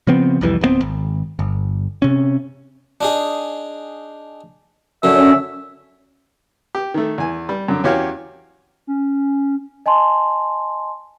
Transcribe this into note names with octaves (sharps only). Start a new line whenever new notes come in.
C#3 F3 B3 C4
C2 F2 E3 G3
D1 G2 B3 C4
G#1
G1
C3 C#4
D4 D#4 G#4
F#2 D3 C#4 E5
G4
D#3 A3
E2 G#5
G3
F#2 D3
E2 C#4 F#4 G4 C#5 F5
C#4
D#5 G#5 A5 C6